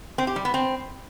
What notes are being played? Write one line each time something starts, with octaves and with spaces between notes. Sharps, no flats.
C4
G4
G3
B3
C4